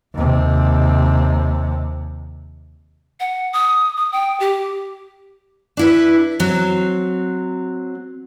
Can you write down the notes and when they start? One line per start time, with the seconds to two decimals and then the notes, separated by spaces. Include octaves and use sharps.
0.14 D#2 C3
3.20 F#5
3.53 D#6
3.97 D#6
4.12 G5
4.40 G4
5.77 D4 E4 B4
6.40 F#3 C4